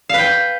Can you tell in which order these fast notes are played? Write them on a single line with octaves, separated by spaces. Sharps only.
F5 B4 G5